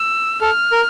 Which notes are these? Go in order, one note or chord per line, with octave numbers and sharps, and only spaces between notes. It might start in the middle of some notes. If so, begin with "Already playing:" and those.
Already playing: E6
A4 F6
A#4